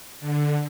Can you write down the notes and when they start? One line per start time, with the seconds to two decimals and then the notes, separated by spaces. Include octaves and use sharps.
0.21 D3